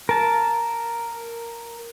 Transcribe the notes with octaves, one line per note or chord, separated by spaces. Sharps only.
A#4 A5